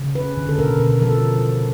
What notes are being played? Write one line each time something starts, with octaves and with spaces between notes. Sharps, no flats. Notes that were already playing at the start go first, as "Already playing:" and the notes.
Already playing: C#3
C#4 B4
D3
A4
B2 A#4
B2
F3 A4